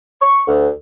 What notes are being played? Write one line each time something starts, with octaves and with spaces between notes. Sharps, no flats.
C#6
D2